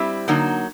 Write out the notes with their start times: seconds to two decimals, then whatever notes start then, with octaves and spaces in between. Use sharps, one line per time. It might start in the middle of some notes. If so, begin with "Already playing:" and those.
Already playing: G3 C4 E4
0.28 D3 F#3 A#3 D#4